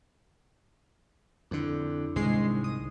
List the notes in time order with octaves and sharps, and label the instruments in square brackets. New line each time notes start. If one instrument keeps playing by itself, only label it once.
[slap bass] F2 D3 [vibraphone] D4 E4
[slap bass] C2 G#2 D#3 [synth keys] G#3 C7
[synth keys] D#6